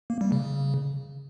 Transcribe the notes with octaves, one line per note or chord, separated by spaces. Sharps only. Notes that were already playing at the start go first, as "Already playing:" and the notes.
A#3
G3
C#3